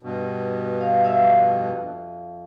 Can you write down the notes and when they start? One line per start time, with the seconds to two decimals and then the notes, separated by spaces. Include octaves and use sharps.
0.03 G2 B2
0.81 F5
1.04 E5 F5
1.22 F2 F#6